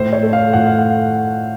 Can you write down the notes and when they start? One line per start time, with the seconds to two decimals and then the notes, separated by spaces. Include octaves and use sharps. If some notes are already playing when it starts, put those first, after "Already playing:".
Already playing: A2 C5
0.13 C#5
0.23 A3
0.33 F5
0.53 A2 F#5
0.67 F5
0.78 F#5